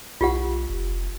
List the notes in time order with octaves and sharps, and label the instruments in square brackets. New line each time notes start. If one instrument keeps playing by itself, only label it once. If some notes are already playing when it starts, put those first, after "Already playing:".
[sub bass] B1 [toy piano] F4 G4 F#5
[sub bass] F1